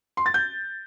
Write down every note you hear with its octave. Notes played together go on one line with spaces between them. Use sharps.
C6
A6
G6